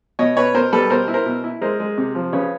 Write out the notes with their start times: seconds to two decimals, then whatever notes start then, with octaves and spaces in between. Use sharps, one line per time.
0.19 B2 C#5 D#5
0.37 B2 B4 C#5
0.54 B2 A#4 C5
0.72 G3 A4 B4
0.90 B2 A#4 C5
1.08 E4
1.14 A#4 C5
1.26 B2
1.44 E4
1.61 G#3 A#4 C5
1.80 G#3
1.98 C3
2.15 F3
2.33 C#3 B4 C#5